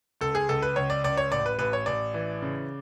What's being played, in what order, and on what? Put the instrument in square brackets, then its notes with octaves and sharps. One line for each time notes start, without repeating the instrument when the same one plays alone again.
[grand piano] C#2 A4
G#4
C#2 A4
B4
C#2 C#5
D5
C#2 D5
C#5
A1 D5
B4
A1 B4
C#5
A1 D5
E3
C#3